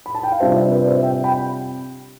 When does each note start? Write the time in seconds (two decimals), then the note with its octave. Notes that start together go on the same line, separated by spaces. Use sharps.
0.06 B5
0.15 A5
0.23 G5
0.32 F5
0.40 C3 G3 D4 F4 C5 E5
0.56 C5 E5
0.72 B4 D5
0.87 C5 E5
1.03 E5 G5
1.24 G5 B5